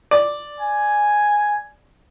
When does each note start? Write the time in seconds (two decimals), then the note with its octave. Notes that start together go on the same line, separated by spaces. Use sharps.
0.11 D5
0.60 G#5